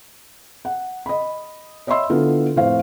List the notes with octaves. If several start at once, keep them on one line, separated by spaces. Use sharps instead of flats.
F#5
D#5 B5
C#5 D#5 E5 B5 C6 E6
D3 B3 E4 F4 A4
F1 A2 C5 F5